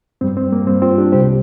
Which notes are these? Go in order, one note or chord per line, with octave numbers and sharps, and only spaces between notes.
G2 G3 C4
C4
A#3
G2 G3 C4
C4 F4
D4 G4
C2 C3 G3 G4 C5